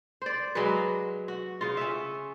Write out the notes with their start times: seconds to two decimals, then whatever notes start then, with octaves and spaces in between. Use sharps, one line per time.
0.22 C5 D5
0.55 F#3 G#3 G#4 B4
1.28 F#4
1.61 C#3 F4
1.77 C#4 E5